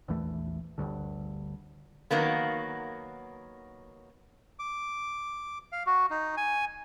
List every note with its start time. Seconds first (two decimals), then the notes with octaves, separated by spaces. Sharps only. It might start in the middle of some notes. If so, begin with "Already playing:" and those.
0.08 A#1 E2 E3 A3
0.78 G1 D2 G2 D3
2.11 D#3 F#3 A#3 B3
4.59 D6
5.72 F5
5.87 F#4
6.10 D#4
6.37 G#5